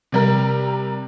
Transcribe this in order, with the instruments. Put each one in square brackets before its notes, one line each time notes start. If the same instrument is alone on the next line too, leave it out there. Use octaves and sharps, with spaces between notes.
[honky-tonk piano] C3 G3 A#4